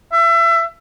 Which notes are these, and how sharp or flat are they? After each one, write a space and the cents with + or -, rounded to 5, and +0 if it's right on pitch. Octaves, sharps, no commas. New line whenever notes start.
E5 +30